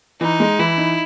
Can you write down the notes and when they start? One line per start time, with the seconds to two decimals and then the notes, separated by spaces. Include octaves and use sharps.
0.21 E3 D#4
0.40 G#3
0.59 E3 E4
0.78 D#4